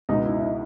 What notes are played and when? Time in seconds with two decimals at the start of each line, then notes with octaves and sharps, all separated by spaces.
0.09 C#2 B2 D#4 D#5
0.25 E4 E5
0.41 D#4 D#5